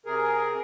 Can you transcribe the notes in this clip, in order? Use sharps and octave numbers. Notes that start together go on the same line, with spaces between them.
C3 G#4 A#4